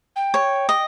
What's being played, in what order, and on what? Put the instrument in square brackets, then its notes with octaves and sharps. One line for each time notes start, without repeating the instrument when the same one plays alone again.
[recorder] G5
[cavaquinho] C#5
D#5